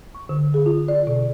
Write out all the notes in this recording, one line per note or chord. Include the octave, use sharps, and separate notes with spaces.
C#6
D3
G#4
F4
D5
B2